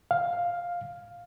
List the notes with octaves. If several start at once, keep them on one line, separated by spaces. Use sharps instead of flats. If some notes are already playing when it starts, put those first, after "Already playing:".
F5